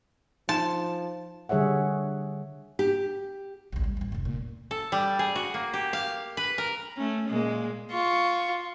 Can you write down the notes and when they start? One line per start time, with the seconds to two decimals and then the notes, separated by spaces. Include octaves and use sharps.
0.49 F3 D#4 A5 C6
1.49 D3 G3 G#4 C#5 E5 F#5
2.79 G4
3.72 A1 D2
3.84 G3
3.97 A1 G2
4.12 F1 C#2
4.25 A#2
4.71 A4
4.92 G3
5.19 G#4
5.36 F#4
5.54 A#3
5.74 G4
5.93 F5
6.37 B4
6.58 A#4
6.96 A3 C#4
7.29 A#2 G#3 A#3
7.91 F4 C#6